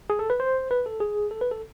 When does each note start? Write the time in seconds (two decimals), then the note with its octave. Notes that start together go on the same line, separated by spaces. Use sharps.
0.10 G#4
0.19 A4
0.30 B4
0.40 C5
0.71 B4
0.86 A4
1.00 G#4
1.31 A4
1.41 B4
1.51 A4